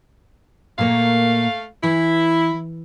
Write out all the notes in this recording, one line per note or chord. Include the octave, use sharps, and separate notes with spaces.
A#2 A3 A#3 C#5 F5
E3 E4